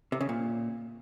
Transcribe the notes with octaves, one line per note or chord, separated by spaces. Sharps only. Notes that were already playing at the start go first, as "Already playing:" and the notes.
C3
C#3
A#2